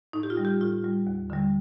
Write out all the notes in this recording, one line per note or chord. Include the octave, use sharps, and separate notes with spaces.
A2 D#4
G4
F4
G3
G4
A2 F4
G3
D#2
D3 G3